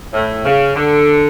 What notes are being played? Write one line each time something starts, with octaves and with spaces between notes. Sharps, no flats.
A2
C#3
D3